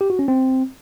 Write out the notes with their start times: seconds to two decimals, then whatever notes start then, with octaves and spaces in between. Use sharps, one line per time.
0.01 G4
0.10 F#4
0.19 C#4
0.28 C4